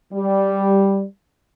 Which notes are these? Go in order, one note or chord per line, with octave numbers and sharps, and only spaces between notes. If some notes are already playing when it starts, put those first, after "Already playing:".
G3